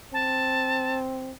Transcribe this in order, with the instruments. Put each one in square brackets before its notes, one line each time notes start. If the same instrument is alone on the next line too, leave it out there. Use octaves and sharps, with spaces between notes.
[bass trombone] C4 [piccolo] A5